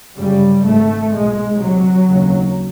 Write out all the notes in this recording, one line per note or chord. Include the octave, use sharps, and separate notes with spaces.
G1 F#2 C#3 G3
G#1 G#2 A3
B1 A#2 G#3
D2 C3 F#3
F1 D#2 C#3